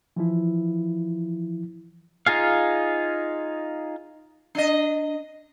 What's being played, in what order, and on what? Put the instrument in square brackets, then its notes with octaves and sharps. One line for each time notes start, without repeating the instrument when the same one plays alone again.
[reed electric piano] E3 F3 E4
[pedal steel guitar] D#4 F4 G#4 F5
[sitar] D4 D#5